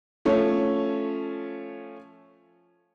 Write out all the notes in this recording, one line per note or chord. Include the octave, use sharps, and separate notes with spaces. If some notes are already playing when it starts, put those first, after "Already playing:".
F3 A3 C#4 C#5